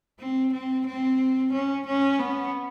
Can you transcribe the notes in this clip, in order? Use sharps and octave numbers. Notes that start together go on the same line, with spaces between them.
C4
C4
C4
C#4
C#4
B3